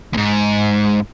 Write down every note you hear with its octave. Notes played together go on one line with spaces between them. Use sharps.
D#2 G#2